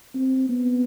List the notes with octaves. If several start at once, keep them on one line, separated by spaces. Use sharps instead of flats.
C4
B3